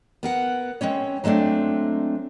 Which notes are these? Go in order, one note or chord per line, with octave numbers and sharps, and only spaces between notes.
B3 A#4 F#5
G#3 C4 C#4 C#5
F#3 G#3 A3 C4 D4